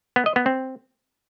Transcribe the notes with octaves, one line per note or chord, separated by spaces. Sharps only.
B3
D#5
B3
C4